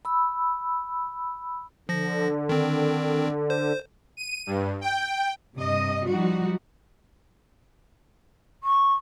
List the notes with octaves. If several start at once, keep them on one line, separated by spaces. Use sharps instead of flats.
B5 E6
D3 F3 A#6
D#3 C4
C5
D#7
G2
G5
G2 C3 D#5
F3 G3 D#4 F#4
C#6